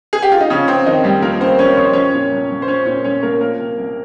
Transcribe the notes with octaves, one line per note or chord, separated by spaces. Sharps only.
G#4
G4
F4
D#4
C#3 F3 C#4
C#3 C4
F2 D#3 D#4
F2 G3 G4
F3 A#3 A#4
C#3 C4 C5
F2 C#4 C#5
F2 C#5
C5
F3 C#4 C#5
A#2
C2
C2
C5
F3 C#4 C#5
A#2 C#4 C#5
C2 C#4 C#5
C2 A#3 A#4
F3 A#3 A#4
C3
C2